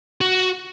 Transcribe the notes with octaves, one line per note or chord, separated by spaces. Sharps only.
F#4